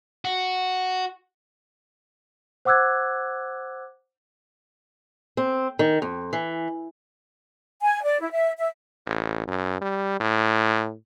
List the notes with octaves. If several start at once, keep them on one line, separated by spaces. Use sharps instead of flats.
F#4
C5 F#5 D6 E6 F#6 G#6
C4
D#3
F2
E3
G#5
D5
E4
E5
E5
A1
F#2
G3
A2